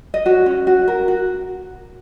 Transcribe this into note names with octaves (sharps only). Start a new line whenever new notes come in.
D#5
F#4 C#5
C#4
F#4
A#4
F#4